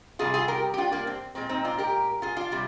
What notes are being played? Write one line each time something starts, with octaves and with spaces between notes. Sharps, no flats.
C3 G3 F4 G#4
F4 G#4
G4 A#4
G4
D4 F4
A#3 D4
C4
A#2 G#3 C4
C4 D#4
D4 F4
G4 A#4
F4 G#4
D4 F4
C3 G3